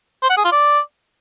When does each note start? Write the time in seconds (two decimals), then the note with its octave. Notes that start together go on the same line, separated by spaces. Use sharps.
0.23 C5
0.30 F#5
0.37 G#4
0.45 F4
0.52 D5